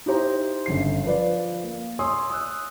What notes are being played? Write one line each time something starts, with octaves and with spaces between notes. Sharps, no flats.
D#4 E4 G4 C5 A#5
G1 C#3 C7
F3 B4 D5
A#3
C#5 G#5 C6 D#6 E6
D#6 E6 F#6